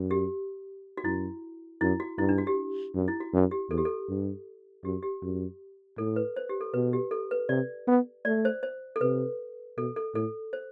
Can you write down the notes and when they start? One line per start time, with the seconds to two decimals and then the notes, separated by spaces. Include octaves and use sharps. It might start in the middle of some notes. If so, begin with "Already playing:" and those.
Already playing: F#2
0.11 G4
0.97 F#4
1.04 F#2 E4
1.81 F#2 E4
2.00 F#4
2.18 G2 E4
2.29 D4
2.38 F#4
2.47 G4
2.95 F#2
3.08 E4
3.20 F#4
3.33 F#2
3.51 G4
3.70 E2 A4
3.78 G4
3.85 A4
4.09 G2
4.84 F#2 G4
5.03 G4
5.22 F#2
5.98 A2 A4
6.16 B4
6.36 C5
6.49 G4
6.61 A4
6.74 B2 B4
6.93 G4
7.11 A4
7.31 B4
7.49 C3 D5
7.87 B3
8.25 A3 D5
8.45 C5
8.63 C5
8.96 A4
9.01 C3 B4
9.77 B2 A4
9.96 A4
10.14 A2 A4
10.53 C5